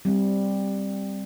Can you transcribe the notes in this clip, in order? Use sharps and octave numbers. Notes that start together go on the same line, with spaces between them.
G3 C4